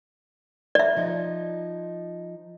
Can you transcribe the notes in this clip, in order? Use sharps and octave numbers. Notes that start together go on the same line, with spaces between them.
D5 E5
F3 D#4